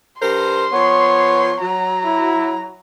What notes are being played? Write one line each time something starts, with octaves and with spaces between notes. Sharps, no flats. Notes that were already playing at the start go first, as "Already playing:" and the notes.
G2 A#4 C5 C6
F3 B3 C#5
F#3 A#5
E4